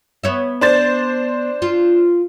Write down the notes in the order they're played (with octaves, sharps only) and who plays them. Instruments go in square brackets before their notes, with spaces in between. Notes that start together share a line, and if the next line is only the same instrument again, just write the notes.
[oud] B3 C#5 E5
[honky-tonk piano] D4 C5 A6
[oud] F4